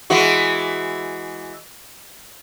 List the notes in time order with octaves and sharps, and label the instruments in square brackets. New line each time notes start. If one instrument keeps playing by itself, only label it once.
[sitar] E3 G#3 F#4